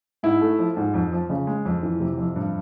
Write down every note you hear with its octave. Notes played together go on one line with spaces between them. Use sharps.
G#2 E4
A3
F3
G#2
F2
F3
C#3
G#3
F2
E3
C3
F2
G2